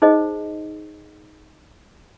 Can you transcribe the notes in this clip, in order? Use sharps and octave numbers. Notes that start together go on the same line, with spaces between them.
D#4 G#4 C5 D#5